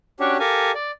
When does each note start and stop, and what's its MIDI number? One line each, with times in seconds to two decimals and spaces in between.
0.20 0.38 61
0.20 0.38 62
0.20 0.38 66
0.20 0.38 67
0.20 0.38 73
0.40 0.72 67
0.40 0.72 69
0.40 0.72 70
0.40 0.72 77
0.40 0.72 80
0.74 0.91 74